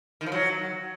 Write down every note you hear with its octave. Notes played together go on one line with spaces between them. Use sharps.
D#3
F3
F#3